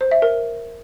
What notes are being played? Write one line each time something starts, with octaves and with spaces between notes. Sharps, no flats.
C5
E5
A#4